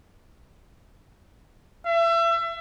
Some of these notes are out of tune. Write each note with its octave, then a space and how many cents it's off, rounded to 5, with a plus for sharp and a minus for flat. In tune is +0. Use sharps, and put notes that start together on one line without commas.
E5 +30